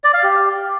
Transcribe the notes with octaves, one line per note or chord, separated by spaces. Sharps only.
D5
F5
G4